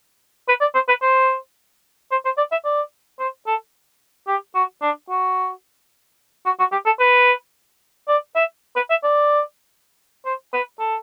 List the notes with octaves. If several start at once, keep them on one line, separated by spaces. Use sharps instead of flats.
B4
D5
C5
B4
C5
C5
C5
D5
E5
D5
C5
A4
G4
F#4
D4
F#4
F#4
F#4
G4
A4
B4
D5
E5
B4
E5
D5
C5
B4
A4